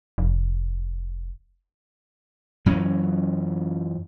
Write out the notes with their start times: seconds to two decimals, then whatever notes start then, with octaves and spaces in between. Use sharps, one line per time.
0.18 F1
2.66 F#2 E3 C#4